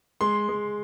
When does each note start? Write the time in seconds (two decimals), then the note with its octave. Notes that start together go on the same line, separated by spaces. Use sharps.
0.21 G#3 C6
0.49 G#3